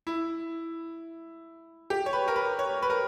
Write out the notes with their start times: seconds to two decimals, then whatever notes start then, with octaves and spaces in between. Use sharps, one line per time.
0.07 E4
1.90 G4
2.06 C#5
2.13 B4
2.28 A#4
2.36 B4
2.59 C#5
2.82 B4
2.90 A#4